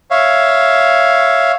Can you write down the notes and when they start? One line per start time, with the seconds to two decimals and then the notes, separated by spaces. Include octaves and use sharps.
0.11 C#5 E5 F5